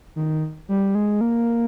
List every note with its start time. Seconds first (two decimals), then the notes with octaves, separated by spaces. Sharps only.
0.16 D#3
0.69 G3
0.95 G#3
1.21 A#3